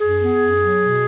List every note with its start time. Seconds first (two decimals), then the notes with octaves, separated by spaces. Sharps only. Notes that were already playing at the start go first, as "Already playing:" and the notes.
0.01 F#2 G#4
0.20 B3
0.39 F#2
0.59 F#3
0.79 B2